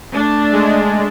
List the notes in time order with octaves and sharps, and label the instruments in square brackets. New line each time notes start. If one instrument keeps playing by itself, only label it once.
[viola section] A3 D4
[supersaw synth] G#3